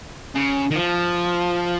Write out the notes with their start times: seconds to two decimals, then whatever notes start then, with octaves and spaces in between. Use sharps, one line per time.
0.35 C#3
0.71 D#3
0.75 F3